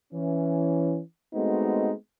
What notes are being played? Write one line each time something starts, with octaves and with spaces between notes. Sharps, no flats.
E3 C#4
G#3 A3 B3 C4 D#4 F#4